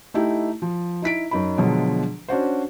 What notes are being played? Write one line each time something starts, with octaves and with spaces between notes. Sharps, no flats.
A3 D#4 E4 G4
F3
D#4 E4 B6 D7
F#2 D#4 B5
B2 D3 F3 F#3 G#3
C#4 D4 F#4 C5